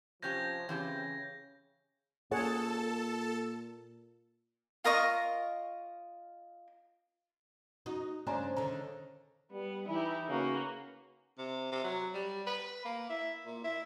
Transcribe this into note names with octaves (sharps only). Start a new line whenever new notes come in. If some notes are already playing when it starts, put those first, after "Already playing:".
C3 F3 C#4 G4 G6 G#6 A#6
C#3 E3 C4 G4
A#2 G#4 A4 C#5 F#5 A5
F4 A#4 D#5 C#6
D#4 F#4
G2 C#3 D4 C5 D5 G#5 A#5
D3 D#3 A#5
G3 B3
E3 D#4 E4 G4
C#3 A#3 B3 F#4
C3
C3
F#3
G3
B4
A#3
E4
A#2
E4